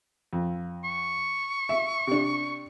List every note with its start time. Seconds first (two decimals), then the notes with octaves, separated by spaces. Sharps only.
0.33 F2
0.84 C#6
1.69 E5
2.07 C3 D4